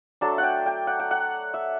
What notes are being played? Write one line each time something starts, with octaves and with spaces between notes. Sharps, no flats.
F#3 A3 D4 A5
F#5
G5
G5
F#5
G5
F#5
E5